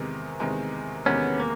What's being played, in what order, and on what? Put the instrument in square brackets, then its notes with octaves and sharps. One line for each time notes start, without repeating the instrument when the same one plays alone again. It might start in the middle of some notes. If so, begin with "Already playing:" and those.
Already playing: [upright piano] E2 C3 D#3 G#3
E2 C3 D#3 G#3
[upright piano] E2 C3 D#3 G#3 [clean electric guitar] B3 C#4
[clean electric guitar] A#3